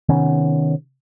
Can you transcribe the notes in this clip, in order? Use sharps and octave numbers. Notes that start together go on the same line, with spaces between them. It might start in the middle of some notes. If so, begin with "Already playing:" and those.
C3 D#3 B3 C#4